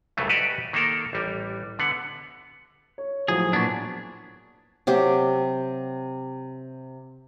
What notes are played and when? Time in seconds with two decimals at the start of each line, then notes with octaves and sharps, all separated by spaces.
0.17 C2 G2 C#3 F#3 A3
0.29 F#4 G4 B4 D5 D#5
0.73 D#3 A#3 A4 A#4
1.13 A1 G3
1.79 D3 B3 F#5
2.98 C#5
3.28 A2 F3 F#3 G#4
3.53 A#2 B3 D4 C#6 G#6
4.87 C3 F#3 G4